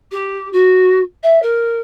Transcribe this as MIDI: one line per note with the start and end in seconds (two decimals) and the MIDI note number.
0.11 0.50 67
0.52 0.99 66
1.23 1.41 76
1.42 1.80 70